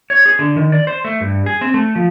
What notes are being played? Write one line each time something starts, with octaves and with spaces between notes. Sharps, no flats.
C#5
G#4
D3
D#3
D5
C5
A3
G2
G#4
C4
A3
F3